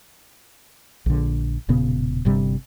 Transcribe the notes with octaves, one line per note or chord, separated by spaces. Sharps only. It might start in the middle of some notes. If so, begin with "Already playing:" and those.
A#1 D3
E1 A#2 C#3 B3
G1 G2 C3 G3